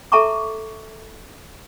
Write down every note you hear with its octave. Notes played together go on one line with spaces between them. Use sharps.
A4 E5 A5 A#5 C#6 D6